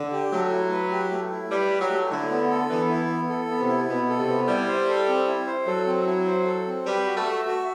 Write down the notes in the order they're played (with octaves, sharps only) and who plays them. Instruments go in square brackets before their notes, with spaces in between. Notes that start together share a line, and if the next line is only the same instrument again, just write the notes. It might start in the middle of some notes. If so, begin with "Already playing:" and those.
Already playing: [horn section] D3
[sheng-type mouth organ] G4
[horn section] F#3 [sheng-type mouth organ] A3
[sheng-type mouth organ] E4
B4
G4
A3
E4
[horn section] G3 [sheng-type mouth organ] B4
[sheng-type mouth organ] G4
[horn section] F#3
[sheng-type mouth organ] A3
[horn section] D3 [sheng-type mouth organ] E4
[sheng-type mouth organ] B3
A4
[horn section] E3 [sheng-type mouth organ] B3
[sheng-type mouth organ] E4
B3
A4
B3
[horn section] C3
[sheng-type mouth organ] E4
[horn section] B2 [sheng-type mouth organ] B3
[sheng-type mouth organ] A4
[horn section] C3
[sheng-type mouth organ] B3
[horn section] G3 [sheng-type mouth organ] E4
[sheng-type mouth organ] C5
A4
C4
E4
C5
[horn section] F#3 [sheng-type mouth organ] A4
[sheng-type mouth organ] C4
E4
C5
A4
C4
[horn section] G3 [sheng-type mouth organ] B4
[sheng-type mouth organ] F#4
[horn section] A3
[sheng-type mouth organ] E5
F#4